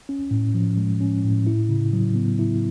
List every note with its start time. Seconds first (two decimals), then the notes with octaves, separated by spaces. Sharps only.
0.09 C#4
0.31 A2
0.55 F3
0.78 G#3
1.01 C#4
1.24 A2
1.47 E4
1.69 C#3
1.93 F#3
2.15 B3
2.39 E4